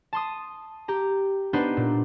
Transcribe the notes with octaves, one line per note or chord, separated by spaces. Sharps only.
A5 C6 D#6
G4 A#5
B3 D4 D#4 B4 C5
A#2